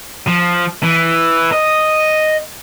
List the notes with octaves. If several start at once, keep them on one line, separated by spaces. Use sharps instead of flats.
F3
E3
D#5